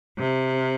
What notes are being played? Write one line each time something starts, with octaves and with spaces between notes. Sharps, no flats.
C3